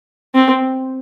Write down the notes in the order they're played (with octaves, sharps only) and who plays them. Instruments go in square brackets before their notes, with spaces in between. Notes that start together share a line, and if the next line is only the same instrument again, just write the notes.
[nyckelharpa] C4